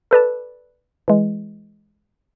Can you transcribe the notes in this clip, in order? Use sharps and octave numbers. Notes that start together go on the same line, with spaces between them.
A4 B4 D5 A5
E3 G#3